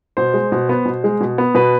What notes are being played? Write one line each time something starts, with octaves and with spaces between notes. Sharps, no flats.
B2 C5
G#3
B2
B3
B2
G#3
B2
B3
B2 B4